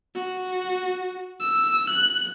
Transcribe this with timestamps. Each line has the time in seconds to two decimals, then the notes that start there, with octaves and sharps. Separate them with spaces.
0.15 F#4
1.41 E6
1.90 F#6